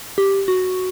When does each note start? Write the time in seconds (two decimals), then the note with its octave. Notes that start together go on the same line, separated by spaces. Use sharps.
0.18 G4
0.48 F#4